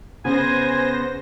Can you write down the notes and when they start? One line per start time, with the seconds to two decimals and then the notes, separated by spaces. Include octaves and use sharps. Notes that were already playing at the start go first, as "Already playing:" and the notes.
0.25 C#3 B3 C5 G#5 A#6